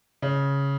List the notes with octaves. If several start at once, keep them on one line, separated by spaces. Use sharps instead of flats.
C#3